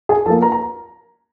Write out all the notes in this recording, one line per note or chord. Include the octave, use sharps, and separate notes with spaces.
G#4 G#5
F3 A#3 A4 A5
A#4 A#5
A#5